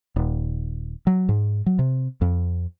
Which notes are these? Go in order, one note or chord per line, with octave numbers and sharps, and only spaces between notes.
D#1
F#3
G#2
F#3
C3
F2